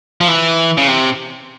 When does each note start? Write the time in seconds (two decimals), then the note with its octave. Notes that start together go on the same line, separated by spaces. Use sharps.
0.21 F3
0.28 E3
0.77 C#3
0.87 C3